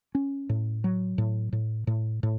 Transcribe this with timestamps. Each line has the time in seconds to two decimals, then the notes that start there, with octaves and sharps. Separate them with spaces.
0.15 C#4
0.49 A2
0.84 F#3
1.18 A2
1.53 A2
1.87 A2
2.23 A2